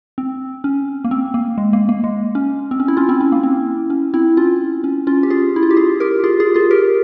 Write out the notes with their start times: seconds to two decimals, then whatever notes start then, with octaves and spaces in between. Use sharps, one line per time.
0.18 C4
0.64 C#4
1.04 A#3
1.11 C4
1.34 A#3
1.58 G#3
1.73 A#3
1.89 A#3
2.04 G#3
2.35 C#4
2.71 C4
2.80 C#4
2.88 E4
2.97 C#4 F4
3.09 C4 E4
3.21 C#4
3.32 A#3
3.43 C4
3.90 C#4
4.14 C4 E4
4.37 C#4 F4
4.84 C#4
5.07 C#4 F4
5.23 G4
5.30 F4 G#4
5.56 E4
5.63 F4
5.71 G4
5.77 F4 G#4
6.00 G4 A#4
6.24 F4 G#4
6.40 F4 G#4
6.54 F4 G#4
6.71 G4 A#4